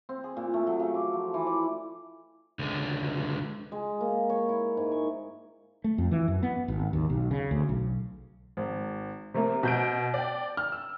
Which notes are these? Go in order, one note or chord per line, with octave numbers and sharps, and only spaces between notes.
C4
G#4
A#2
A3
F#3
C#3
D6
F3
E3
D5
C#2 D3
G#3
A#3
C#5
E4
G#2
C#6
A3
F2
E3
F#2
B3
G#1
D#2
B1
C#3
D2
B1
G#1
C3 A3 A#3
B2 G6 D7
D5 G5
F6
E6